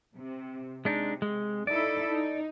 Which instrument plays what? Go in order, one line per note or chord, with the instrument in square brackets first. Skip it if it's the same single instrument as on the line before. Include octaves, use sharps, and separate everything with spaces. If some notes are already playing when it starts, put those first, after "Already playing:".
[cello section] C3
[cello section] C3 [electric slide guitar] G#3 D4 D#4
[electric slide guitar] G#3
[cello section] D#4 E4 A4 [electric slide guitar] D5
[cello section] D#4